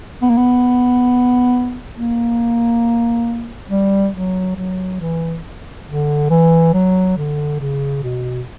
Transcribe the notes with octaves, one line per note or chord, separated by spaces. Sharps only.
B3
A#3
B3
A#3
G3
F#3
F#3
E3
D3
E3
F#3
D3
C#3
B2